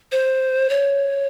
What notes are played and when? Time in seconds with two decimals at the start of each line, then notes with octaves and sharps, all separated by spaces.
0.12 C5
0.70 C#5